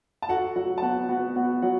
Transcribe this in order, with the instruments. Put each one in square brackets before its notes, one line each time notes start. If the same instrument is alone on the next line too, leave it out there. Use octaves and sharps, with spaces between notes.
[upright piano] A5
[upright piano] F#4 F#5 [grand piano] A4
[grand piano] F#3 [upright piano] F#4 F#5
[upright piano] A5
[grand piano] B3 [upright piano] F#4 F#5
[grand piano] B3 [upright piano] F#4 F#5
[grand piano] B3 [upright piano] F#4 F#5
[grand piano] F#3 [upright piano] F#4 F#5